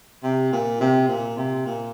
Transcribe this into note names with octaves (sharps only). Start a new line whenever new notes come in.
C3
A#2
C3
A#2
C3
A#2